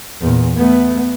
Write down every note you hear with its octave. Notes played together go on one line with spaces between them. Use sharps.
E2 A#2
A3 B3